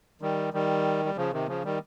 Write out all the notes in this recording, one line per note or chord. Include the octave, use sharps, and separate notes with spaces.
D#3 G3
D#3 G3
G3
C#3 F3
C3 D#3
C#3 F3
D#3 G3